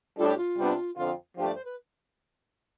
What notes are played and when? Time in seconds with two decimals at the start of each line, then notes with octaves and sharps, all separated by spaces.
0.18 A2 G3 D4 F4 A4
0.27 G4
0.37 F4
0.57 C3 G3 B3 D4
0.96 F2 D3 F3 C4 F4
1.36 G2 F3 A3 D4 G4
1.44 D5
1.54 C5
1.65 B4